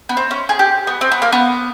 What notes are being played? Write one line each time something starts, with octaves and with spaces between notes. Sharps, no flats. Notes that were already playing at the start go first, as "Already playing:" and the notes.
B3
C4
C#4
G#4
G4
B3
C4
B3
A#3
B3